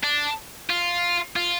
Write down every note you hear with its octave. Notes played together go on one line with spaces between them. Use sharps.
D4
F4
F4